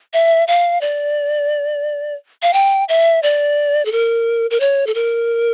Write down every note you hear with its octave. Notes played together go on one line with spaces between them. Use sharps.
E5
F5
D5
F5
G5
E5
D5
A4
A#4
A#4
C#5
A4
A#4